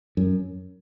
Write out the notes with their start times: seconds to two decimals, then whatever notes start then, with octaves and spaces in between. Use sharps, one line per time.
0.17 F#2